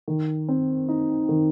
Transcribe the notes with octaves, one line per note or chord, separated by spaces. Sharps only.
D#3
C4
D#4
D#3